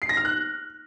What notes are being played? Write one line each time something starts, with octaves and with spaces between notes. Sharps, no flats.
C7
A#6
F6
F#6